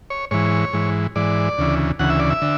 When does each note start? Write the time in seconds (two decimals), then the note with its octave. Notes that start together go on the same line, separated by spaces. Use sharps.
0.10 C#5
0.31 G#2 E3 C#5
0.73 G#2 E3
1.15 G#2 E3 D5
1.58 D2 C#3 E3
1.99 D2 C#3 E3 F#5
2.10 E5
2.19 D5
2.30 E5
2.42 D3